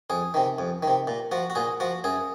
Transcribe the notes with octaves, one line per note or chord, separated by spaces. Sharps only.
F2 G#4
C3 D#3
F2
C3 D#3
A#2
F3 F#4
F#4
A#2 G#4
F3 F#4
F#2 G#4